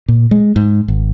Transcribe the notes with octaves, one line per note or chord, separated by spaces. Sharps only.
A#2
G#3
G#2
G#1